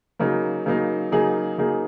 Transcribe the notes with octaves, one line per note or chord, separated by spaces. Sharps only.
C#3 F#3 A#3 D#4
C#3 F#3 A#3 D#4
C#3 F#3 A#3 D#4 G#4
C#3 F#3 A#3 D#4 G#4